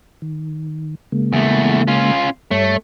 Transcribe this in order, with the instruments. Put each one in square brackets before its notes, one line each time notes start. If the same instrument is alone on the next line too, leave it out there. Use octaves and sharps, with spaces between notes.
[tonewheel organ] D#3
C#3 G#3 A#3
[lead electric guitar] E2 A3
C#4 F4
[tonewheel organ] G2 G3 C#5 [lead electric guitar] A3